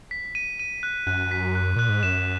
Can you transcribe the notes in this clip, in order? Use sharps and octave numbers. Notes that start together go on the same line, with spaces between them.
B6
D#7
D#7
F#6
F#2 F#6
B6
F#6
A#2 F#6
G#2
F#2 E7